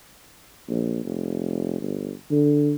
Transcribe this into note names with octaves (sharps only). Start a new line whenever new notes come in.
A#1
F1
G1
D3